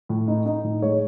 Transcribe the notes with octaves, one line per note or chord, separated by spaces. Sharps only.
A2
D#4
D#4
A2
G#3 C#5